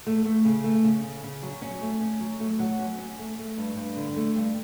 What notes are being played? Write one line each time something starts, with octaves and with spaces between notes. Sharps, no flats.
A3
A3
C#3
A3
C#3
C#3
C#3
F#3
C#4
A3
C#4
F#3
A3
F#3
C#4
C#4
A3
A3
G2
G2
D3
A3
G2